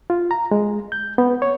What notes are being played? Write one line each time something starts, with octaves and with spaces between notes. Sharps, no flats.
F4
A#5
G#3
G6
B3
C#5